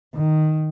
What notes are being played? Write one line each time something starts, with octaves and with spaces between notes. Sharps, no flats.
D#3